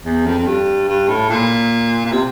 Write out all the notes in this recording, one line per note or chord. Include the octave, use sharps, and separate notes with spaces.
E2
F2
F2
G2
G2
A2
A#2
A#2
C3